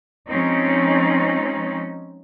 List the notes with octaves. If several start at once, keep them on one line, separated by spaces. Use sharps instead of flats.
F3 G#3 C4 C#4 D#4